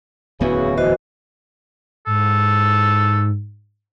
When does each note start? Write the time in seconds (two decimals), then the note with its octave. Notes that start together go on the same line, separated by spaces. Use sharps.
0.40 D1 E2 C#3 E3 B3 F#4
0.77 E3 F#4 C5 D#5
2.06 G#2 A4